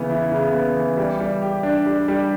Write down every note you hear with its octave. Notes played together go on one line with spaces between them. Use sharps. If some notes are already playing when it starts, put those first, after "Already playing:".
Already playing: C#3 E3 B3
E4
C#3
B3
E3
G3
G3
G4
D4
G3
G3